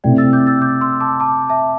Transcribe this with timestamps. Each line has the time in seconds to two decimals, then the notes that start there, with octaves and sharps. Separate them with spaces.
0.04 C3 A3 E4 D5 G5
0.18 E6 A6
0.33 D6 G6
0.47 E6 A6
0.62 D6 G6
0.81 C6 E6
1.00 A5 D6
1.20 A5 D6
1.50 E5 A5